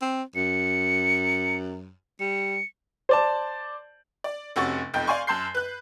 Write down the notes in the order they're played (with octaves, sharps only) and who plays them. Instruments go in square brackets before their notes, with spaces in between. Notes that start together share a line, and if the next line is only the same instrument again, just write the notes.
[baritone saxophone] C4
[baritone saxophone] F#2 [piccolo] C#7
[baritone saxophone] G3 [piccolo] C#7
[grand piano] C5 D5 A5
[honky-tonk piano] D5
F1 C3 C#4 F#4 C#6 A6
F1 B1 F2 G5 G6
D5 F5 G#5 C6 C#6
F#2 A5 C6 G6 C7
B4 F#6